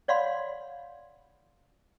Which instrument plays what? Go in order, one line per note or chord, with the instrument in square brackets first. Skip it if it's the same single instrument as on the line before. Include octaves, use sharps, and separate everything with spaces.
[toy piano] C#5 D5 F5 F#5 B5 C6